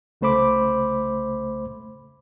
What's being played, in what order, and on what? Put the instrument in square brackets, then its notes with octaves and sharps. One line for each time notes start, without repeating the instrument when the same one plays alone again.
[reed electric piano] C2 C#3 A3 C5 B5 D6